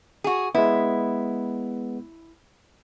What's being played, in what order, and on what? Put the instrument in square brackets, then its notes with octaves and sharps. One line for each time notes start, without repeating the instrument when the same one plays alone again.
[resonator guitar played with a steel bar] F#4 G#4
[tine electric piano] G#3 B3 [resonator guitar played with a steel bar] E4